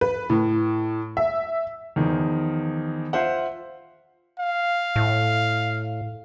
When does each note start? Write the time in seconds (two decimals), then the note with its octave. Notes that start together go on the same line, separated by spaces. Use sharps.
0.01 B4
0.30 A2
1.17 E5
1.96 E2 D#3 F3
3.13 F4 C5 E5 F#5
4.39 F5
4.96 A2